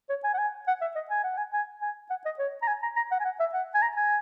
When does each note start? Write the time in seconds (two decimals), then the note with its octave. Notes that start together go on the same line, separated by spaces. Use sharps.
0.10 C#5
0.24 G#5
0.34 F#5
0.39 G#5
0.68 F#5
0.81 E5
0.96 D#5
1.10 G#5
1.24 F#5
1.38 G#5
1.53 G#5
1.82 G#5
2.10 F#5
2.26 D#5
2.39 C#5
2.62 A#5
2.67 G#5
2.83 A#5
2.96 A#5
3.12 F#5
3.20 G#5
3.25 F#5
3.40 E5
3.54 F#5
3.74 G#5
3.82 A#5
3.97 G#5